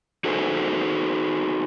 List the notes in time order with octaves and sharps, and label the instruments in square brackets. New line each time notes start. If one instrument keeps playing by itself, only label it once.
[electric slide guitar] D#4 F#4 G#4 A4 C5